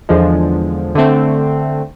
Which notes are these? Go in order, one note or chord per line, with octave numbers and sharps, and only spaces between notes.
E2 D3 F3 G#3
D3 A3 C4